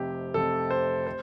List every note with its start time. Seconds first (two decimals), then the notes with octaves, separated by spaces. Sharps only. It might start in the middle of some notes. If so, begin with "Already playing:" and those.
Already playing: F1 F2 C3 G4
0.34 F1 F2 C3 A4
0.70 C5
1.06 C5